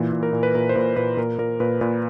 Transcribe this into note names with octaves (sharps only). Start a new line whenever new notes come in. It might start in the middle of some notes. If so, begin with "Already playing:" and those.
Already playing: A#2 E3
A#2
A#4
A#2
B4
A#2 A#4
C5
A#2 B4
A#2 B4
A#2 A#4
A#2 A#4
A#2 B4
A#2 B4